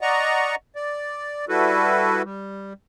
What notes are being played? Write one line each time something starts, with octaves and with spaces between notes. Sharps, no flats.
D5 D#5 F#5 A#5 C#6
D5
G3 E4 F#4 A4 B4
G3